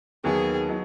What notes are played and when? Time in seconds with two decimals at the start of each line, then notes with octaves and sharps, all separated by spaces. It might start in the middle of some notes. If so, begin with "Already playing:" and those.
0.24 D#2 D#3 F#3 B3 D#4 G#4
0.69 F#3 B3 D#4